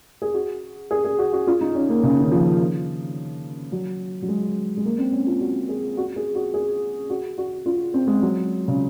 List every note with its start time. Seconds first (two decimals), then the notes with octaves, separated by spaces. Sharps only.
0.22 G#4
0.34 F#4
0.91 G#4
1.04 G#4
1.19 F#4
1.33 F#4
1.47 F4
1.61 D#4
1.75 C#4
1.89 A#3
2.03 C#3
2.20 D#3
2.31 F3
3.72 F#3
4.22 F#3
4.28 G#3
4.77 G#3
4.85 A#3
4.98 C4
5.12 C#4
5.27 F4
5.40 F#4
5.69 G#4
5.97 F#4
6.16 G#4
6.35 F#4
6.54 G#4
7.10 F#4
7.38 F#4
7.66 F4
7.94 C4
8.07 G#3
8.22 F#3
8.68 C#3